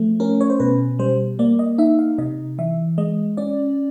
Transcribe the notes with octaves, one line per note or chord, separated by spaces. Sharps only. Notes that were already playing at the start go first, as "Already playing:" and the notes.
Already playing: F3 A3
C#4 A#4
C#5
C5
B2 B4
G3 C5
A#3 D5
D#5
D#4 E5
F5
C3 D#5
E3 E5
G#3 D#5
C#4 D5